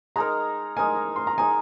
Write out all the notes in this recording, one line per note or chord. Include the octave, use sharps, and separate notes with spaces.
G#3 D#4 A#4 A#5
G#3 D#4 A#4 G#5
C6
A#5
G#3 D#4 A#4 G#5